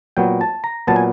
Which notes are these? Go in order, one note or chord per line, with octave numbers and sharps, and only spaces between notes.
A#2 F#3 B3 G5
A5
A#5
A#2 F#3 B3 A5
G#5